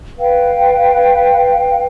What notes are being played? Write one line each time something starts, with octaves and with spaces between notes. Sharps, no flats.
B4 F5 G5